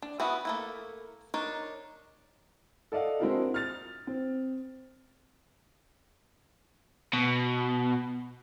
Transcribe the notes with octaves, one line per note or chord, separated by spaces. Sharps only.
D4
B3 E4 F#4 G#4 E5
A3 A#3 E4
D4 D#4 A#4 C#5
A4 D5 D#5 F5 F#5
G#3 C4 D4 E4 F#4 A#4
F6 A6 F7
C4
B2